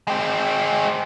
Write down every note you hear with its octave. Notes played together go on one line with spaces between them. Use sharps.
G#3 C4